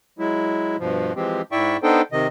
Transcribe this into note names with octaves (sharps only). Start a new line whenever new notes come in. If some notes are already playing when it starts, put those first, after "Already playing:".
F#3 G#3 E4
G2 B2 F3
E3 F3 G#3 C4 G4
G#2 E4 D5 E5 G5 C#6
B3 D4 D#4 A4 C5 G5
C3 D#3 D#5